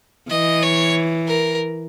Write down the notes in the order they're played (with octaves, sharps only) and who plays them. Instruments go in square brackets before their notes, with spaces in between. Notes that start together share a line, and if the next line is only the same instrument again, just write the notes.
[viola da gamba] E3 [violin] D#5
[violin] C#5
A#4